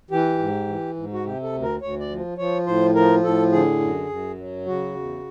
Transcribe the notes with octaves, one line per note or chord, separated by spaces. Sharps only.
E3 G4
G#2
E3
G#2
F#4
C3 G4
A4
D2
A#4
D2 C#5
D5
F3
F3 C#5
A2 C5
F3 A#4
A2 A4
D3 G#4
F#2
F#2
F#3
C#3 F#4
E2